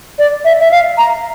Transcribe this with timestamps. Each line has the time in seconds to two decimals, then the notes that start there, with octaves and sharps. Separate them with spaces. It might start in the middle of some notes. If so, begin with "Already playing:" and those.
0.19 D5
0.45 E5
0.60 E5
0.71 F5
0.98 A#5